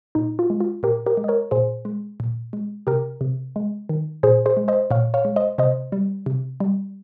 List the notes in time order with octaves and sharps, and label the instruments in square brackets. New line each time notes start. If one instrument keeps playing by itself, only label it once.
[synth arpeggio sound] A#2 D#4
F4
G#3
F4
A#2 G4 A#4
G4 A#4
G#3
D#5
A#4 C#5
A#2 G#4 C5
G#3
A#2
G#3
C3 G4 A#4
C3
G#3
D#3
A#2 G#4 C5
G#4 C5
G#3
C5 D#5
A#2 C#5 F5
C#5 F5
G#3
C5 D#5
C3 C5 D#5
G3
C3
G3